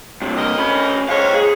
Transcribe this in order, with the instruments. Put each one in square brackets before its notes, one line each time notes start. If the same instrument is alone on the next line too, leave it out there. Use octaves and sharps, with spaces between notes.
[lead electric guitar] G2 C3
[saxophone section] D2 A#4 D#5
[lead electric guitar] C#4 B5
[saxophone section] F2 G#2 C#5 [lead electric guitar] D#5 F5
[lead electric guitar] G#4